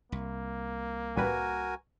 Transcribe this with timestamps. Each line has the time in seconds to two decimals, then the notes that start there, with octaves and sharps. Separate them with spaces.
0.12 C2 A#3
1.16 A1 G3 F#4 A#4 B4 G#5